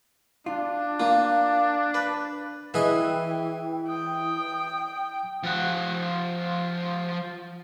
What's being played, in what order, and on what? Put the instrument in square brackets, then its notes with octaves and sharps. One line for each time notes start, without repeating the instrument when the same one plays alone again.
[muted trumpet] D4 [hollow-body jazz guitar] F4
[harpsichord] A#3 [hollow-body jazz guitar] F4
[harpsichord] B4
[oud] E3 [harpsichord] E4 G#4 D#5 [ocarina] G5
[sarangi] G5 [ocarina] D#6
[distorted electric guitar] F3 F#5